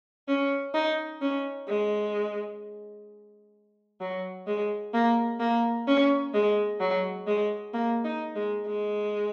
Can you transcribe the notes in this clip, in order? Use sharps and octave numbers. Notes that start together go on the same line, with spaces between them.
C#4
D#4
C#4
G#3
F#3
G#3
A#3
A#3
C#4
G#3
F#3
G#3
A#3
D#4
G#3
G#3